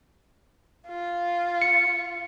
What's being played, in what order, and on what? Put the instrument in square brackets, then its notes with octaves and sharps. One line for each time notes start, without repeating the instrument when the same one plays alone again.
[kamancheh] F4
[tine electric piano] C#7